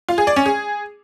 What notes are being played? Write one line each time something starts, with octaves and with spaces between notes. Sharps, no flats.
F4
G#4
D5
C#4
G#4